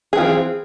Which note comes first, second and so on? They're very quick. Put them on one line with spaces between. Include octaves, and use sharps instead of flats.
G#4 E3 F4 C4